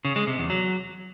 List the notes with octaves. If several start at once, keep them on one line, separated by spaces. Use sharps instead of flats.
C#3
G#3
C3
E2
F#3